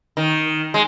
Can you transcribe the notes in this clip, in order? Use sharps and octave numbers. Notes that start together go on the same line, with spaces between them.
D#3
G#3